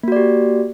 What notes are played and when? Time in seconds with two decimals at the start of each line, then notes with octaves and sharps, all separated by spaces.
0.03 A#3
0.08 F#4
0.12 D5
0.16 G4